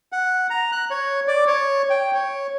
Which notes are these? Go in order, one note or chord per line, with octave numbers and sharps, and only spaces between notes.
F#5
A#5
F#6
C#5
D5
C#5
G5
C#5